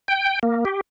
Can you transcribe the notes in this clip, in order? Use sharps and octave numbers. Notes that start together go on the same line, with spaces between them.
G5
A#3
G4